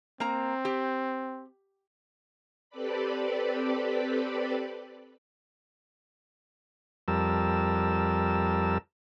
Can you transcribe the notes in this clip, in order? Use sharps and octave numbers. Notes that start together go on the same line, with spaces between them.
A#3 C4 A#5
G4
C4 G4 A4 B4 D5 B5
F2 G3 A#4 A5 E6